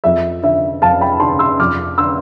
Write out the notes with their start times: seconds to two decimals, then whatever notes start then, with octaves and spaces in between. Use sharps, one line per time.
0.04 F2 E5
0.43 D3 E5
0.82 F2 F5 A5
1.00 G5 B5
1.20 D3 A5 C6
1.39 C6 E6
1.59 F2 D6 F6
1.98 D3 C6 E6